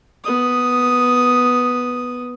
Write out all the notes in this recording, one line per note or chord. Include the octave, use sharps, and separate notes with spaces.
B3 D#6